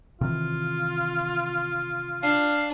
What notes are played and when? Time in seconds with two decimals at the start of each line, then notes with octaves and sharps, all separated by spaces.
0.21 C3 D#3 E3 F4
2.23 D4 F5